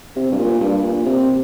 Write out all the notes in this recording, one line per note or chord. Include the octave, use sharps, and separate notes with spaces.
C3
G2
A#2
G2
A#2
C3